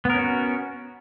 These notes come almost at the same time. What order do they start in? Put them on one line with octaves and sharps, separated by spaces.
B3 A#4 C#4 F#4